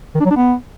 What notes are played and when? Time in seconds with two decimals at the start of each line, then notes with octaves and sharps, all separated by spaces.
0.15 D#3
0.20 D4
0.25 F#3
0.31 D4
0.36 B3